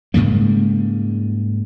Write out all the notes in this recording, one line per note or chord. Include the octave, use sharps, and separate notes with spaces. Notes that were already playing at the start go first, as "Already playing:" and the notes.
G#2 C#3 G3 A#3